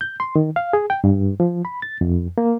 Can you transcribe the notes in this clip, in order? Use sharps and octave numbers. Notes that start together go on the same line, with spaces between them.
G6
C6
D#3
F5
G#4
G5
G2
F3
B5
A6
F2
A#3